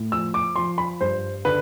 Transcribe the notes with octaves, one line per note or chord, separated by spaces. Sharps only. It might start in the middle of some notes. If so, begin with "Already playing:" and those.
Already playing: A2
F3 E6
D6
F3 C6
B5
G2 C5
D3 B4